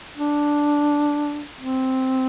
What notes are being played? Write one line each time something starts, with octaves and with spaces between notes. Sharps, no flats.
D4
C4